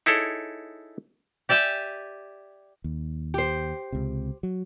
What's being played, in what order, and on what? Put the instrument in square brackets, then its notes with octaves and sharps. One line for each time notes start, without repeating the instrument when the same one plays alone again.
[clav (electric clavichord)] D#4 E4 G#4 A4 C#5
[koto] G4 D5 E5 G5 G#5
[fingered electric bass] D#2
[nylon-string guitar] G4 C5
[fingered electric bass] C#2 C3
F#3